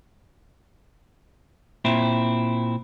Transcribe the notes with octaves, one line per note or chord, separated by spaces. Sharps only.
A#2 C4 E4